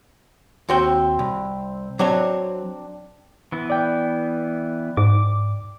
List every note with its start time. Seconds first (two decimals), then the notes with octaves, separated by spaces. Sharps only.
0.69 D#2 C4 F#4 G5 C6 E6
1.19 C2
1.99 F#3 C4 D4 C#5
3.52 E3 B3
3.70 D5 G5
4.97 G#2 D6